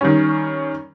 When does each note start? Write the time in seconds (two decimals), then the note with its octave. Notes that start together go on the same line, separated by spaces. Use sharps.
0.01 D#3 G3 C#4